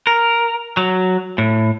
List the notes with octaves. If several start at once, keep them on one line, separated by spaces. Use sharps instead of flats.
A#4
F#3
A2